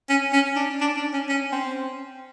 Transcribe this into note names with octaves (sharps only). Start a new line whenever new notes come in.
C#4
C#4
D4
D4
D4
C#4
C#4
C4